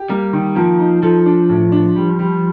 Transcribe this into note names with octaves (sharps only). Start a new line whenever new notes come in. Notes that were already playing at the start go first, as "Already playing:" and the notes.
Already playing: G4
G3 A#3
D#3
F3 A#3
D#4
F3 A4
D4
A2
D4
G3
G3